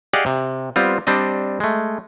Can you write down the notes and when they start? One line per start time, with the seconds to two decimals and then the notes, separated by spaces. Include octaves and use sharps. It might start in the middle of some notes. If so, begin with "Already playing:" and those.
0.13 G4 G#4 D5 D#5 F5 F#5
0.26 C3
0.76 G3 B3 C4 F4
1.07 G3 C4 D4 D#5
1.60 G#3 A3